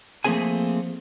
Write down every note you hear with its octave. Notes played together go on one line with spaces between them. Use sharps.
F3 A3 A#3 C4 G#4 G#5